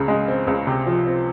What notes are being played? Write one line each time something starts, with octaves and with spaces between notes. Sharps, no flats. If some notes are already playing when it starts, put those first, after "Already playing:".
Already playing: C#2 C#3
G#3
C4
C#2
C3
F3
C4